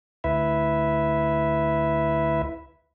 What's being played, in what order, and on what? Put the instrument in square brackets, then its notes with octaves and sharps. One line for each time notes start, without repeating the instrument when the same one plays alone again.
[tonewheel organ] D2 E4 B4 E5